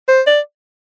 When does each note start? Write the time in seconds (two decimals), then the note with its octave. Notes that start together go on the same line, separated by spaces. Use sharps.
0.08 C5
0.27 D5